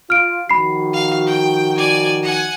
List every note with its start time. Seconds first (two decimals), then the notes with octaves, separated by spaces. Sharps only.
0.10 F4 F6 D7
0.49 D#3 F3 F#4 B5 C7
0.93 F5
1.26 G5
1.77 D5 G#5
2.23 F#5 G#5